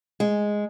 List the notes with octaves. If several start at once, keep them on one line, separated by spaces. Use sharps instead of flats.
G#3